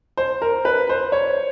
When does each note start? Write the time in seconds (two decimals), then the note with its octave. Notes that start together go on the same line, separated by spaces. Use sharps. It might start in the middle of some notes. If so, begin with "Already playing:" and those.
0.17 C5
0.42 A#4
0.65 B4
0.89 C5
1.12 C#5